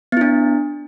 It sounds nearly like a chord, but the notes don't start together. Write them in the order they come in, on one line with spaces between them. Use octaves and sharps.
B3 E4 D4